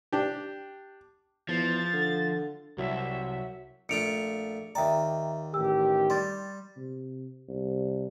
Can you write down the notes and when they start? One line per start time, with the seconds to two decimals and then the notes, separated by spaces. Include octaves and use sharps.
0.12 D4 G4
1.48 E2 F3 A6
1.93 D3
2.78 C2 F#3 E5
3.89 A#1 A3 F4 C#7 D7 F7
4.75 D#2 D5 E5 G5 A#5
5.54 A1 D#3 G4 E6
6.10 G3 C6 A6
6.76 C3
7.49 C2